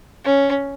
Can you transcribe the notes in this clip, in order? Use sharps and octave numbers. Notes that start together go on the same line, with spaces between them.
C#4